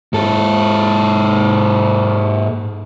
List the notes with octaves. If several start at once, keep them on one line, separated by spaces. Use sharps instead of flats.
G#2 A4